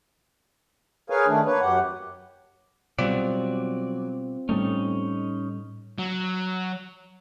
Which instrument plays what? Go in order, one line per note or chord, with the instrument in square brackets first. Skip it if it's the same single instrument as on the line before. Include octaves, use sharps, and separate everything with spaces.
[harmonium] G#4 A#4 B4 C#5 F5 G#5
D#3 A3 D4
A#3 B4 C#5
F#2 G4 F#5
[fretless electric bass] B2 G3 [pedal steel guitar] F#3 D5 [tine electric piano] C4 F4
[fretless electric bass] A2 G3 A3 [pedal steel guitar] C#4 D#4
[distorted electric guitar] F#3